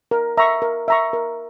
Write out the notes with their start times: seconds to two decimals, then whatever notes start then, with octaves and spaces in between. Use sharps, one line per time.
0.11 A#4
0.37 E5 A#5 C#6
0.62 A#4
0.88 E5 A#5 C#6
1.13 A#4